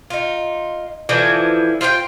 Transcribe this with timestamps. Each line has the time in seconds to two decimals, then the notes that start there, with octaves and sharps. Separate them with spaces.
0.10 D#4 F4
1.09 D3 E3 F3 E4
1.81 F4 C5 D5 G5